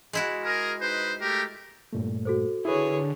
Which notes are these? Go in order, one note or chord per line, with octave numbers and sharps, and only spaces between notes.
G#3 E4 F#4
G#4 A#4
D#4 B4 C5
A3 G4 A#4
G2 A#2 A3
F#4 A4 C5
D3 E4 G#4 B4 C#5